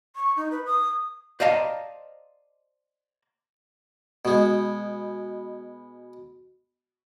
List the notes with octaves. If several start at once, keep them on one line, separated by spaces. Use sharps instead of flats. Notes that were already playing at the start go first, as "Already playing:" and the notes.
C#6
D#4
B4
D#6
C5 D5 D#5 F5 A5 A#5
B2 G#3